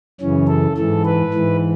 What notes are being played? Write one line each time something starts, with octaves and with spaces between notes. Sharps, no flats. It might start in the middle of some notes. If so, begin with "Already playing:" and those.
F#2 C#3 E3 C#4
A4
G#2 E3 A4
B4
G#2 E3